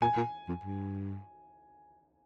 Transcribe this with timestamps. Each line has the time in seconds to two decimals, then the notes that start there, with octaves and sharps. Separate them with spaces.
0.02 A#2 G#5
0.17 A#2
0.49 F2
0.63 G2